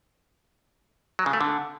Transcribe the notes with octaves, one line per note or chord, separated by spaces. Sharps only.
F#3
C#3
A3
D3